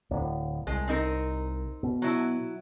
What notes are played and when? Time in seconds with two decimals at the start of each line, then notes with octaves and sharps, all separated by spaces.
0.11 D1
0.67 C2 G#3
0.88 C4 D#4 A#4
1.83 B2
2.02 F#3 E4